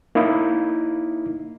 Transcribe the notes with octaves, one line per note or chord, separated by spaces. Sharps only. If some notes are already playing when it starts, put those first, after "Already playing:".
A#3 D#4 E4